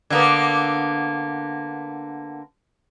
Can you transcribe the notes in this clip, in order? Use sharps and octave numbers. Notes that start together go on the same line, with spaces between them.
D3 A#3 B3